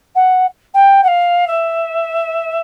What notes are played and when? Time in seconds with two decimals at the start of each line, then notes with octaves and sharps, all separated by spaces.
0.15 F#5
0.74 G5
1.03 F#5
1.07 F5
1.47 E5